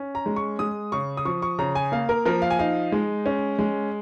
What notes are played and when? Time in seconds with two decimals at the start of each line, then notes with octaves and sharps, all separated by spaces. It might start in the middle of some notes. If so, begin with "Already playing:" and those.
Already playing: C#4
0.15 A#5
0.26 G#3
0.36 C#6
0.59 G#3 D#6
0.92 C#3 C#6
1.17 D#6
1.25 F3 C#6
1.42 C#6
1.59 C#3 A#5
1.75 G#5
1.92 A#3 F5
2.09 A#4
2.26 F3 A#4
2.42 F5
2.50 G#5
2.59 D#4 F5
2.92 G#3
3.26 C#4
3.59 G#3